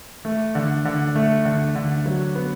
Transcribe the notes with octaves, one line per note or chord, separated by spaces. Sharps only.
A3
D3
D3
A3
D3
D3
F#3
B3